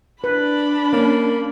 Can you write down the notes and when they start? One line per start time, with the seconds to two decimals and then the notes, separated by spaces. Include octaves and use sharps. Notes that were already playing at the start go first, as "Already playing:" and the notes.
0.24 D4 B4 B5
0.93 A#3 C#4